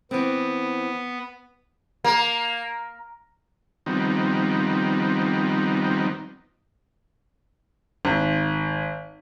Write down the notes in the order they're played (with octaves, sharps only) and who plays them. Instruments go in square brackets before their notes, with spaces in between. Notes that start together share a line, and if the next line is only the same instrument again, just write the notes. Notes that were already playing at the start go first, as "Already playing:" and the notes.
[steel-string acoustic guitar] E3 C4 [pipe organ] B3
[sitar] A#3
[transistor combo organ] D#3 F3 G3 B3 C4 D#4
[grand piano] G#1